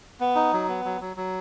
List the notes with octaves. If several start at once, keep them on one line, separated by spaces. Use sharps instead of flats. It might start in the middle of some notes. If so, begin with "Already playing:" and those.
B3
D#4
F#3
B3
F#3
F#3
F#3